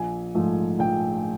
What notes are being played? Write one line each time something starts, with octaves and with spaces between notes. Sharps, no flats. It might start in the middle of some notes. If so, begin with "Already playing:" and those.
Already playing: A#1 G#5
G#2 F3 A3
A#1 G5